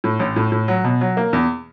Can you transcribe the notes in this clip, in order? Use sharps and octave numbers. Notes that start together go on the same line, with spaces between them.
A2
A1
A2
A2
F#3
B2
F#3
A#3
E2